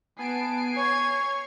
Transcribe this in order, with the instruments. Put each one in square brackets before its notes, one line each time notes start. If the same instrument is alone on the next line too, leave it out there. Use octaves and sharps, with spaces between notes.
[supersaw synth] B3 D7 [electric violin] G#5 C7 [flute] A5
[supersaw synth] C#5 [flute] C#6 [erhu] G#6